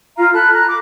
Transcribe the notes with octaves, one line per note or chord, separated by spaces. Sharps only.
F4 F5 A#5
A4 B5 F#6
A#5 F#6
D6